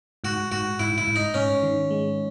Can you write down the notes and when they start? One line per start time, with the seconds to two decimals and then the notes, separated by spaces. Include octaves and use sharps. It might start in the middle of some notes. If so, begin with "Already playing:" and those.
0.24 G#2 F#4
0.52 G#2 F#4
0.79 G#2 E4
0.98 E4
1.07 G#2
1.16 D#4
1.34 G#2 C#4
1.63 D#3
1.90 G#3